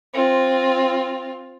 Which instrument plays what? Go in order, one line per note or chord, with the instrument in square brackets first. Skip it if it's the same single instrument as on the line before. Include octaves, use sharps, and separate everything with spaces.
[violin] C4 F4